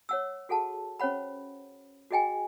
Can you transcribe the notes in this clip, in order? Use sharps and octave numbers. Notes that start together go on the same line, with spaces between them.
C#5 F#5 E6
F#4 G#4 A4 F#5 A5
C#4 C5 C#5 F#5 B5
F#4 G#4 D#5 G5 G#5